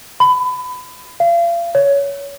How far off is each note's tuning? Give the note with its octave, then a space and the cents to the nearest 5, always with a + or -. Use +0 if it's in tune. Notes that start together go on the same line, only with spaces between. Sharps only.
B5 +25
F5 -35
C#5 +15